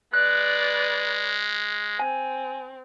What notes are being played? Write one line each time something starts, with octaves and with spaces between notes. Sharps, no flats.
G#3 B4 D5 F#6
C4 G#5